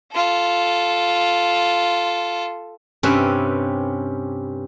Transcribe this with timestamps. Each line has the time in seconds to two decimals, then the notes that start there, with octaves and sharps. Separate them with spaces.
0.12 F4 A4
3.03 G2 C3 C#4 B4 E5